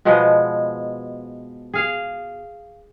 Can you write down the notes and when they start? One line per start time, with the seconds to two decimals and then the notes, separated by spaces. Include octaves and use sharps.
0.05 B2 F3 G#3 B3
1.74 G#4 F5